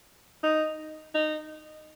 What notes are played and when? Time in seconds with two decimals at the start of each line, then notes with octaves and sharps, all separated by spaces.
0.43 D#4
1.15 D#4